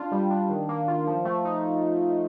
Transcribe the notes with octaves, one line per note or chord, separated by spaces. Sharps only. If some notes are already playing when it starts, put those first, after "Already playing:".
Already playing: D4 F4
G3
D4
D#3
A#3
F4
F3
A3
D#4